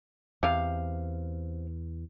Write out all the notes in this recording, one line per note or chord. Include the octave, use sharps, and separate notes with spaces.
E2 C3 F5